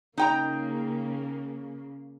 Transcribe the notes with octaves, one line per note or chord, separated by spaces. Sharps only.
C#3 A#3 D#4 G5 A#5